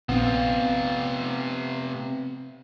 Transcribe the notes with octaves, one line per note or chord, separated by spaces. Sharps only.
A#1 C3 B3 C4 F4